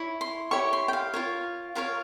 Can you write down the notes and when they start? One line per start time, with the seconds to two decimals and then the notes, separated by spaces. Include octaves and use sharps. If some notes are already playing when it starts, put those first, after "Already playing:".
Already playing: E4 C#5
0.21 C6
0.51 E4 G4 C#5 C#6
0.73 C6
0.88 G5
0.93 F5
1.14 F4 A#4 C#5
1.75 F4 A#4 C#5 F5